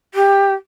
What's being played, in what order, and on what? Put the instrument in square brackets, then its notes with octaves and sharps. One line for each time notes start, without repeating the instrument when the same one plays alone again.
[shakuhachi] G4